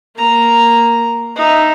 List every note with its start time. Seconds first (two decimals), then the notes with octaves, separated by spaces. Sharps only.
0.16 A#3 A#5
1.36 D#4 E5